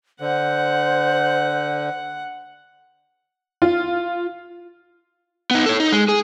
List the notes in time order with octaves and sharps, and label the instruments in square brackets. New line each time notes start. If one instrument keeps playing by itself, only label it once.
[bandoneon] D3 [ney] C5 [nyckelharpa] F#5
[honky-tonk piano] F4
[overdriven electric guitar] B3 D#4
A4 C#5
D#4
G#3
G#4